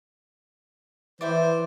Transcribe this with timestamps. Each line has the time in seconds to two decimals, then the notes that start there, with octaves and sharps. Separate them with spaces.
1.21 E3 C5 D5 E5 G5